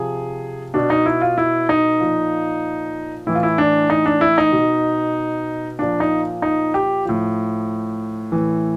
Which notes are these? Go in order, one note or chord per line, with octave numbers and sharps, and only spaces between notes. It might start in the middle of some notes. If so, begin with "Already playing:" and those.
Already playing: C3 F3 G#4
B2 D4
D#4
E4
F4
E4
D#4
A#2 F3
A2 E3 E4
F4
E4
D4
D#4
D4
E4
D#4
B2
A#2 F3 D4
D#4
D#4
G4
A2 F3
A2 E3